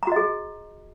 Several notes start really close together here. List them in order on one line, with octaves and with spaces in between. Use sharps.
A#5 F#4 D#5 G#4